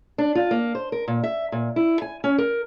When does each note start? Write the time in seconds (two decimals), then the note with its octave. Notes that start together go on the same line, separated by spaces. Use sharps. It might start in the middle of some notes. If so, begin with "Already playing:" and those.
0.18 D4
0.35 F4
0.51 A#3
0.75 C5
0.92 A#4
1.08 A#2
1.24 E5
1.52 A#2
1.76 E4
2.02 G#5
2.24 C#4
2.38 A#4